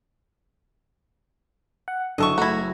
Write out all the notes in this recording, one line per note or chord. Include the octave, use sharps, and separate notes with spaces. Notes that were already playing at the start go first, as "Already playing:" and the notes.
F#5
F#1 D3 A4 D#5 E5 C#6
A3 E4 F#4 A#5 G#6